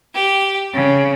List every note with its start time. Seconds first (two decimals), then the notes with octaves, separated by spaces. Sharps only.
0.13 G4
0.74 C#3